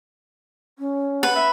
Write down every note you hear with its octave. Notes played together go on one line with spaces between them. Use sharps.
C#4
B4 F#5
E5